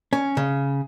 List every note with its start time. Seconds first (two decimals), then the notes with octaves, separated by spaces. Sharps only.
0.13 C#4
0.37 C#3